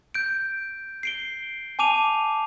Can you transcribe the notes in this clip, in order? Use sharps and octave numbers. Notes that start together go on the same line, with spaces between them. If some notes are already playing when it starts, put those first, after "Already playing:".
G6 D7
C7 D7 G7
G#5 A5 D6 D#7 F7